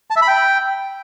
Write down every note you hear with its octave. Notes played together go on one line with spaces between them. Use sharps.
A5
E5
B5
G5